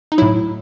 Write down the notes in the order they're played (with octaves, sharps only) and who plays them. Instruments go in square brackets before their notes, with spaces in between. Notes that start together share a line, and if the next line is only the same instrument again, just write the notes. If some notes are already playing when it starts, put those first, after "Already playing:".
[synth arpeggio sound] D#4
A2 F#3 E4